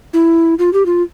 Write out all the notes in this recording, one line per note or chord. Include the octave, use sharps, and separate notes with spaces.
E4
F4
G4
F4